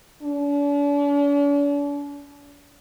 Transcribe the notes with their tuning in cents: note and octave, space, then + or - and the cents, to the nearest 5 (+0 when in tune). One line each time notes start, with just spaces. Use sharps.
D4 -45